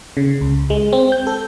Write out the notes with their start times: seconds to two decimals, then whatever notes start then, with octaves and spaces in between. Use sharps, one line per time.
0.17 C#3
0.41 C#2
0.70 G#3
0.93 C4
1.12 G6
1.27 A4